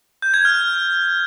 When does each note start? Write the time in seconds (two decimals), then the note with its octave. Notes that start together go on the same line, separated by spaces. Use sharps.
0.22 G6
0.34 G#6
0.45 F6